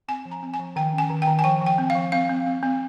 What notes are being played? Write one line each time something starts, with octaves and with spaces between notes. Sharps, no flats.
C4 G#5
F3
A#5
C4
G#5
F3
D#3 G5
C#4
G#5
D#3
G5
D#3
G#5
F3 G5
F3
G5
C4
F5
F3
C4 F5
C4
C4
C4